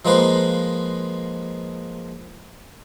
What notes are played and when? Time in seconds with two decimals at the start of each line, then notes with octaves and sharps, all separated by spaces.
0.05 F3 G#3 A#3 B4 C5